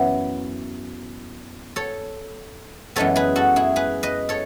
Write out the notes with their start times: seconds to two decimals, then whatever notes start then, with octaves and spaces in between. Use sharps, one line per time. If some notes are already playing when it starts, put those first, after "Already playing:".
Already playing: F#2 E3 B3 C#5 E5
1.76 A4 C#5
2.96 F#2 E3 G#3 B3 A4 C#5
3.16 G#4 B4
3.36 F#4 A4
3.56 E4 G#4
3.76 G#4 B4
4.03 B4 D#5
4.29 A4 C#5